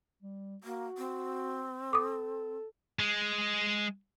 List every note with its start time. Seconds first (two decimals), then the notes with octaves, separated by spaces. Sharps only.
0.22 G3
0.64 A#3 F#4
0.98 C4
1.93 A4 D6 D#6
2.99 G#3